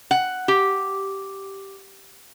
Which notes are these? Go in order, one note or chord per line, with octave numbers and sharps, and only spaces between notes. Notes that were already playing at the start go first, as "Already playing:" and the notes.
F#5
G4